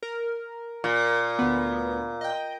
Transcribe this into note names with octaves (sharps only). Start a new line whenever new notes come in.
A#4
A#2
D2 B3
D#5 G5